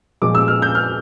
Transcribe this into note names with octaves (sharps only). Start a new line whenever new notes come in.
A#2 F3 G#3 D6
E6
F6
G6
F6